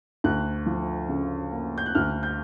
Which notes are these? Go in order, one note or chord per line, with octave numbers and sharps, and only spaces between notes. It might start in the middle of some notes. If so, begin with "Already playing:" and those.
D2 F#6
F3
C#3
A#3
G6
F#6
D2 F6
G6